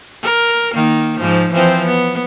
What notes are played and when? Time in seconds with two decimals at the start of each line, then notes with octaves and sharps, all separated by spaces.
0.23 A#4
0.74 D#3 A#3
1.20 G#2 F3
1.53 E3 F3 C4
1.86 B3